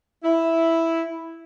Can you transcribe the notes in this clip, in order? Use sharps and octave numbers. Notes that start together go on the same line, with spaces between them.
E4